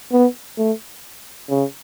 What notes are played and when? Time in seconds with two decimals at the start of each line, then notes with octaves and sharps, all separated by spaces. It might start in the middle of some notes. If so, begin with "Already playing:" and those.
0.12 B3
0.58 A3
1.50 C#3